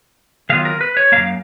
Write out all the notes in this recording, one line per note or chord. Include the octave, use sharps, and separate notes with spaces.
D#3 F#3 B3 F4 F5
A#4
B4
C#5
F#2 F3 A#3 F5